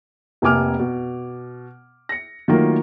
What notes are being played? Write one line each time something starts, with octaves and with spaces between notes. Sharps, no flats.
F1 C3 A#3 G#5 D6 F6
B2
A#6 C#7
D#3 F#3 A3 A#3 F4 A#4